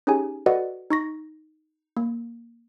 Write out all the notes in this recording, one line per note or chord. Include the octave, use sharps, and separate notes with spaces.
C#4 D#4 G4 G#4 G#5
F#4 A4 B4 D5 D#5 F#5
D#4 C#6 A#6
A#3